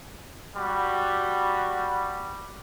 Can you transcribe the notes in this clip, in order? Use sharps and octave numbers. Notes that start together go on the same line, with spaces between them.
G3 F#4 B5